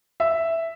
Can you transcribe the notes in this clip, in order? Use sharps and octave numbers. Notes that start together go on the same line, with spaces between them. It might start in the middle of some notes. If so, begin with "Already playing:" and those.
E5